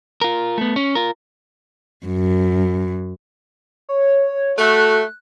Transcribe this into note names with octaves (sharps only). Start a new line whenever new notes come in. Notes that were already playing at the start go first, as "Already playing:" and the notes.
F4 A#4
A3 B3
C#4
F4 A#4
F#2
C#5
A3 F#4 F#6